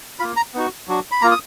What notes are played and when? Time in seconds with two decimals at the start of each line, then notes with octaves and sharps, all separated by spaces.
0.19 A#3 F4 B5
0.36 A#5
0.54 B3 D#4 F#4
0.88 F#3 D4 F#4
1.11 B5
1.22 A#3 F4 A#5
1.31 D#6